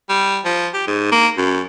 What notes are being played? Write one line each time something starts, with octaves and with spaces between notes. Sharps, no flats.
G3
F3
G4
G#2
A#3
F#2